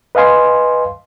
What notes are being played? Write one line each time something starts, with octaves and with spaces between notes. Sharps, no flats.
B4 D#5 F5 G#5 C6